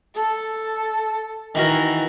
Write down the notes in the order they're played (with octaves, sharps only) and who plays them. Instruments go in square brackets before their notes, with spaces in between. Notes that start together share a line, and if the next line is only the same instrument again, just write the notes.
[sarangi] A4
[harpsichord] D#3 F#4 A#4 [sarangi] E3